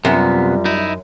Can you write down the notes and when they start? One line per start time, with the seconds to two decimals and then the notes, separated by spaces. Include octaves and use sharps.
0.05 F#2 C3 G3 B3 F4
0.65 D#4 E4